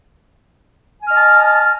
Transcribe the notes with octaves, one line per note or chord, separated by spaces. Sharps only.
D#5 G#5 A5 F6